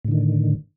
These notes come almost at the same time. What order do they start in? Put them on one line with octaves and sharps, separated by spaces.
A2 D3 D#3